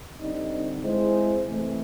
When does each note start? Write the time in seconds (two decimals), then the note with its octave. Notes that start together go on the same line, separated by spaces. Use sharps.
0.20 D3 G3 C4 D#4
0.83 G#3 C4 E4 G#4 C5
1.45 C3 E3 A3